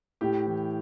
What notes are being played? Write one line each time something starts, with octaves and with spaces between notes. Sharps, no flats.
A2 G4
E3